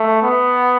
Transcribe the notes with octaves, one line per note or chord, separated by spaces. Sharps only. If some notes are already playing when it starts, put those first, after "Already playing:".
Already playing: A3
B3